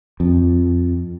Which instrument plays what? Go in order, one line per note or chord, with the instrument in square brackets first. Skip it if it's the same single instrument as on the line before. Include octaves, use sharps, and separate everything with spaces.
[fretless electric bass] F2